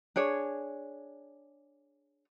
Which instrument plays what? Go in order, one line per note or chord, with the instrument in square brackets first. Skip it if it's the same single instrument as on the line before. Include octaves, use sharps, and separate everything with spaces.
[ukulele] D4 G#4 C#5